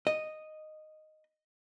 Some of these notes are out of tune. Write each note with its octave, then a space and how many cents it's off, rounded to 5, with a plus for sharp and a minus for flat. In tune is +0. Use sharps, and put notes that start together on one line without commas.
D#5 -5